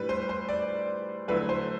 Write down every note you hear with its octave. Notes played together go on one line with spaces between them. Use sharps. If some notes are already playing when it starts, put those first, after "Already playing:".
Already playing: A2 G3 D4 B4
C5
C5
D5
D3 F#3 A3 E4 B4
C5